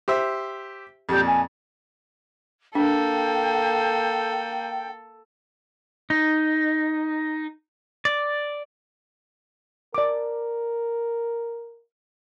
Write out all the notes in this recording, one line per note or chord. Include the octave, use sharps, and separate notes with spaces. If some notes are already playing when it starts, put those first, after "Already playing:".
G4 C5 E5
F2 A#2 G4
G#5
A#3 D4 A4 G5
D#4
D5
A#4 D5 D6